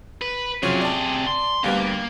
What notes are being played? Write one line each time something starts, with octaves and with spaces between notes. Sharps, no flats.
B4
C3 F3 F#3 C#4 G#4
D5 A5
C6
D2 G3 A#3 B3